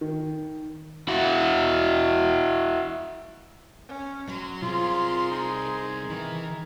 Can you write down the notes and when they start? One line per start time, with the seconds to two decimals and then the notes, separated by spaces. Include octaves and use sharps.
0.01 D#3
1.08 E4 F#4
3.89 C#4
4.28 F#3 C6
4.62 C2 C4 F4 G#4 A#4
5.31 D#4
6.10 D#3 E3